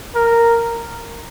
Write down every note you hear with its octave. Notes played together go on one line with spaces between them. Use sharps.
A#4